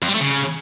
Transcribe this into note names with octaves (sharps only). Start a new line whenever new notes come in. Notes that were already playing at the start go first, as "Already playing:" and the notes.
F2
G3
A3
C#3